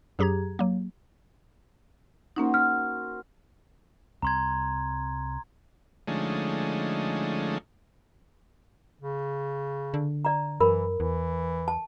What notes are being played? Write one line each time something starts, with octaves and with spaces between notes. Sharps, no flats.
F#2 F#3 G4 G#4 A#5 G#6
F#3 A#3
A#3 C#4 D#4 F#4 A#4 C5
F6
C2 G3 C4 A#5 C6 G#6
D3 F3 G#3 A3 C#4 D#4
C#3
D3
D5 A#5
F#2 E3 A#4 B5
E2 E3
A5